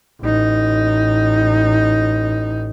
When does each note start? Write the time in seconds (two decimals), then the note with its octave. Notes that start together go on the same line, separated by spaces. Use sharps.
0.20 A1 D#4